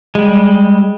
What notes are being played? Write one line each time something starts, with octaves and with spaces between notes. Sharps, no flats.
G3 G#3